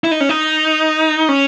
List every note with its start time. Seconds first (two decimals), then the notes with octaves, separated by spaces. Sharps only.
0.04 E4
0.11 D#4
0.20 C#4
0.29 D#4
1.29 C#4